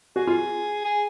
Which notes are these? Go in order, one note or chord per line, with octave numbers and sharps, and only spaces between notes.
F#4 G#4
F4
G#4